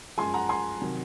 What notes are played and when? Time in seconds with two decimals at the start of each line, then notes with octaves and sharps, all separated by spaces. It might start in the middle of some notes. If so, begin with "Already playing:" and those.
0.18 F#2 F3 G#3 G#5 C6
0.34 F#5 A#5
0.49 G#5 C6
0.81 C3 D#3 F#3